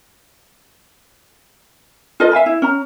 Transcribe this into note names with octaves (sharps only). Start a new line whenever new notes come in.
F4 A4 B4 D#5
E5 F5 G#5 B5
E4
C#4 A#5